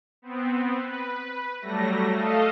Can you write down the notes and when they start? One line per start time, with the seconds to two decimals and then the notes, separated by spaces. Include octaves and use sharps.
0.22 B3 C4
0.78 B4
1.61 F#3 G3 A3 A#6
2.13 A3 A4 D#5 F5